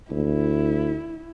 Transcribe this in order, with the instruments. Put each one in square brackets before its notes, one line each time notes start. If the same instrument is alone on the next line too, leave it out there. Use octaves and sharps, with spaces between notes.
[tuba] D2 [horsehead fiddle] E4